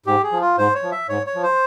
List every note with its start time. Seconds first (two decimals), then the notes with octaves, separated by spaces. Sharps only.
0.06 G#2 G4
0.23 G#4
0.32 F3
0.41 F4
0.58 G#2 C5
0.75 C#5
0.83 F3
0.92 E5
1.08 G#2 C#5
1.27 C#5
1.35 F3
1.43 C5